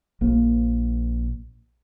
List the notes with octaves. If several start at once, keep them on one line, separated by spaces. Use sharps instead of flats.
A#1 A#3